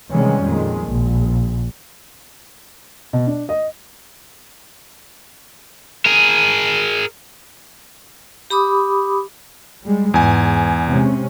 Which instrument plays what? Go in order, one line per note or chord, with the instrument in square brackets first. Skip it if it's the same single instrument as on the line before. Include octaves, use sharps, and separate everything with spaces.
[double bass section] C3 D#3 E3 G3 G#3 C#4
F2 A#2 D#3 G#3
A#1
[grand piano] B2
D4
D#5
[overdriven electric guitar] G#4 A#4
[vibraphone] G4 B5 D6 D#6
[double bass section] G3 G#3
[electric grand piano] E2 G#5 [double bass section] G#2
[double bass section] C3 G#3 C#4